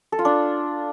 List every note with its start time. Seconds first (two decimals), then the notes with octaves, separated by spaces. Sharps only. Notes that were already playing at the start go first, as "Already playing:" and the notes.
0.12 A4
0.19 F4
0.25 D4